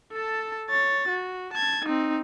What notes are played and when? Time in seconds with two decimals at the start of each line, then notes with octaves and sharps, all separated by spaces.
0.13 A4 A5
0.70 C#5 A6
1.09 F#4
1.53 A5 G#6
1.85 C4 D#4